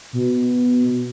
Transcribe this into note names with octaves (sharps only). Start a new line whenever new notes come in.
B2